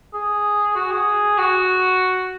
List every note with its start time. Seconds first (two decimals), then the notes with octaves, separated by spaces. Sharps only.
0.14 G#4
0.76 F#4
0.91 G#4
1.38 F#4